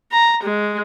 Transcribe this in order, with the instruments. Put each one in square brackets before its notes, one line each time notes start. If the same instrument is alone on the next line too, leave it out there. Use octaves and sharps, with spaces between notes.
[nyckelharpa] A#5
G#3